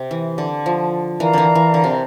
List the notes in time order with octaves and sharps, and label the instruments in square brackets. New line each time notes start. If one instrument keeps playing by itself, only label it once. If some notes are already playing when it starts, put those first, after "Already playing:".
Already playing: [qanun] C3
E3
D3
F3
[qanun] E3 [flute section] A#4 D5 F5 A#5
[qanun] D3 E3
E3
D3
C3